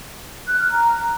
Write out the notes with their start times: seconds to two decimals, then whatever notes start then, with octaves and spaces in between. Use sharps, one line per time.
0.46 F#6
0.58 F6
0.70 A#5